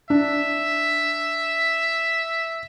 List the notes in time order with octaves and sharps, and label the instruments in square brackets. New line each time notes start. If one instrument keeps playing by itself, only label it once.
[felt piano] D4 [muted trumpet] E5